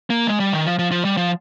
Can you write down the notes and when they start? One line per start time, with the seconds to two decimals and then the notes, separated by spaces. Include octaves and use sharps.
0.10 A#3
0.27 G#3
0.40 G3
0.53 D#3
0.66 F3
0.79 F3
0.91 F3
1.05 G3
1.17 F3